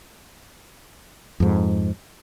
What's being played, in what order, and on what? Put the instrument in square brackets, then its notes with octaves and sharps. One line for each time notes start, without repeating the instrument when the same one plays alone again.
[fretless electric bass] F2 G#2